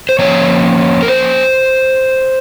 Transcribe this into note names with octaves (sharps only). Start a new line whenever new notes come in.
C5
F3 A#3 C#4 C#5
A#4
C5